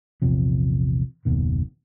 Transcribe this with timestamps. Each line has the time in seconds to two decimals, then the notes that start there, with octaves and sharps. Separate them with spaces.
0.22 A#1 E2 C3 F3
1.25 F#1 D#2 B2 D#3